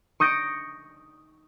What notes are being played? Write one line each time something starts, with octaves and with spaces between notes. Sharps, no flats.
C#6 D#6 G6 A#6 C#7 D7